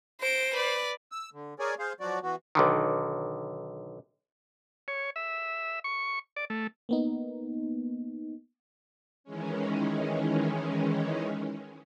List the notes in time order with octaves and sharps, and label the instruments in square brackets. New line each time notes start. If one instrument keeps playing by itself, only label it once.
[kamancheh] C5 [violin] A#6 D7
[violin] B4 D5
[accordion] E6
D3
G#4 A#4 C#5 D5 G#5
G#4 C5 F5
F3 F#3 F#4 D5
E3 B3 F#4
[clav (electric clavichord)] B1 D3 D#3
[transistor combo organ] C#5
E5
C#6
D5
A3
[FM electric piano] A#3 B3 D#4
[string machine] D#3 E3 G#3 C#4